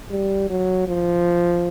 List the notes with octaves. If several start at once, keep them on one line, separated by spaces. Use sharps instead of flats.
G3
F#3
F3